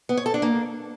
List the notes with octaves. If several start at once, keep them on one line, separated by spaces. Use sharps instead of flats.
B3
C#5
A4
D4
A#3